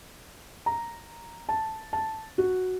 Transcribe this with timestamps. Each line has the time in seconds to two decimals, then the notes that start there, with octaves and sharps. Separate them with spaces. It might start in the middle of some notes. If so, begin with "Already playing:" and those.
0.66 A#5
1.49 A5
1.93 A5
2.38 F#4